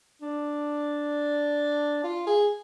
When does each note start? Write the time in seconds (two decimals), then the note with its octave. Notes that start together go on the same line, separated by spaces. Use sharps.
0.22 D4
2.04 F4
2.27 G#4